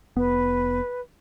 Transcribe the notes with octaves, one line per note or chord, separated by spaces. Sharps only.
F1 B3 B4